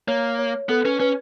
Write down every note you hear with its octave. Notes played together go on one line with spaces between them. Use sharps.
A#3 C#5
C#5
B3 A4
C#4 B4
C#4 B4